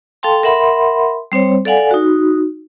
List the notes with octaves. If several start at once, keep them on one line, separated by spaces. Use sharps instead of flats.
A4 F5 G5 A5 C6
A#4 E5 F#5 B5 C6
G3 C4 C5 C#5
A4 D5 F5 F#5 G#5
D#4 F#4